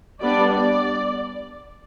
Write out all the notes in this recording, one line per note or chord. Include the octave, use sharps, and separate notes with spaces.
G3 B3 D4 D5
D5